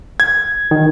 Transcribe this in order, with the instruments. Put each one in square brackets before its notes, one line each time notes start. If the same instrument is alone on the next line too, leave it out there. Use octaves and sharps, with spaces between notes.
[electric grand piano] G#6
[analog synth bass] D#3